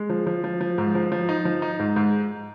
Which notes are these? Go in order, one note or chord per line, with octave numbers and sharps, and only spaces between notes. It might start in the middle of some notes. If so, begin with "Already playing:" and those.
Already playing: G#3
F3
F3
F3
F3
G#2
F3
F3
D#4
F3
D#4
G#2
G#2